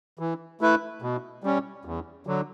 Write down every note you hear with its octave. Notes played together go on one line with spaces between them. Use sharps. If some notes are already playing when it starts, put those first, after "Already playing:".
E3
A3 E4 B4
B2
G3 C#4
E2
D3 F#3